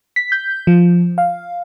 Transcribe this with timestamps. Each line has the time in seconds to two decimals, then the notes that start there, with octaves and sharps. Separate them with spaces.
0.16 B6
0.32 G6
0.67 F3
1.18 F5